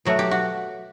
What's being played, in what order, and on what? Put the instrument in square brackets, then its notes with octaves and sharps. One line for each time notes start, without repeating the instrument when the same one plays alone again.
[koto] B2 F#3 A3 F#4
G4
F#4